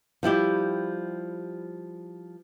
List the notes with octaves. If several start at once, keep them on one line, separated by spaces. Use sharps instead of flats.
F3 G3 E4 G4